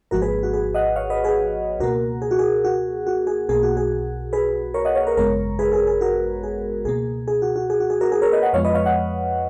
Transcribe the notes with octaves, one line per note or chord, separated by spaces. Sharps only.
G#1 G#2 F3 A#3 F#4 A#4
G#4 B4
F#4
G#4
D#5 F#5
C#5 F5
B4 D#5
G#4 B4
C#2 B2 A#3 F#4 A#4
G#4
F#4
G#4
F#4
F#4
G#4
B1 B2 A#3 G#4
F#4
G#4
G#4 B4
A#4 C#5
D#5 F#5
C#5 F5
A#4 C#5
G#1 F#2 C#3 G#3 B3 A#4 C#5
G#4 B4
G#4
G#4
F#4 A#4
G#4
C#2 B2 A#3 G#4
G#4
F#4
F#4
G#4
F#4
G#4
F#4 A#4
G#4
A#4 C#5
B4 D#5
D#5 F#5
F2 F3 G#3 B3 C#5 F5
B4 D#5
C#5 F5
D#5 F#5